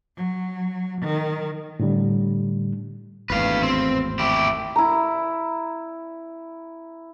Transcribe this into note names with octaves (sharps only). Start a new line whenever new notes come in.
F#3
D#3
A2 D3 G3
G#1 E2 A2 B4 F5
C4
E4 G4
E4 A#5